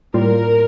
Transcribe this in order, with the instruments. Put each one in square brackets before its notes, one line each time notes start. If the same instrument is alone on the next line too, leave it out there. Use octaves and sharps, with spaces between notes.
[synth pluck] A2 G3 A#3 F4 [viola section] A#4